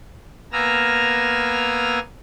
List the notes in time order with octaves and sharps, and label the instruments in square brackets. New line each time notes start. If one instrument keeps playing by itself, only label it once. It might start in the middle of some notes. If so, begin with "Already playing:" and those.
[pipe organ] A#3 B3 G#5 A#5 E6 F6